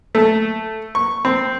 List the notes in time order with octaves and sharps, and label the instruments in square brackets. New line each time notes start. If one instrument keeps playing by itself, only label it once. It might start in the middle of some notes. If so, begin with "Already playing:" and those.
[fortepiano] A3 A4
C#6
C4